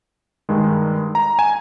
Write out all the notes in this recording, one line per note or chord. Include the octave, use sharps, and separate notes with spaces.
G2 D#3 G#3
A#5
G#5